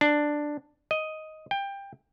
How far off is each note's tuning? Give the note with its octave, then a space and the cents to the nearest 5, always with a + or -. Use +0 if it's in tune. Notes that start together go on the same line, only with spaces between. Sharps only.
D4 +5
D#5 +5
G5 +20